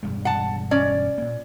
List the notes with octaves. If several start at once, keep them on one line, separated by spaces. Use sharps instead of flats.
E1 G2 G#3
F#5 A5
C#4 D5
A#2 A#3